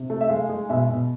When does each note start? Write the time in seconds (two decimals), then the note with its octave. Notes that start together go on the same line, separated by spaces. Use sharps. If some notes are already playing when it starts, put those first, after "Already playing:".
Already playing: C3
0.10 A3
0.21 E5
0.29 G#3 F5
0.49 G#3
0.69 B2 E5
0.90 B2